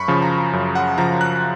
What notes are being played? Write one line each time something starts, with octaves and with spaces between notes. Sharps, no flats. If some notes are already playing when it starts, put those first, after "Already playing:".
Already playing: F#2 B5 C#6
C#3 F3
A#5
F#2
F#5
C#3 F3 A#5
F#6